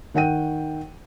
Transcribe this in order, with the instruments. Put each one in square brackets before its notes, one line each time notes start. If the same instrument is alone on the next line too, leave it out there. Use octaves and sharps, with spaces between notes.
[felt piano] D#3 F#5 G5 D#7